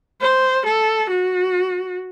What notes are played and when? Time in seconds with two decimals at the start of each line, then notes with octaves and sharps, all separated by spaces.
0.21 C5
0.66 A4
1.10 F#4